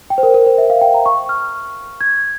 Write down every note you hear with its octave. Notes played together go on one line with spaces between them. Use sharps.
G5
C5
A#4
A#4
C5
E5
F5
G5
A#5
C#6
F6
G#6